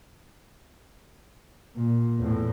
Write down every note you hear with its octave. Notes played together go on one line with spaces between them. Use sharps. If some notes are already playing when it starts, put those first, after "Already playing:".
A#2
E2 A2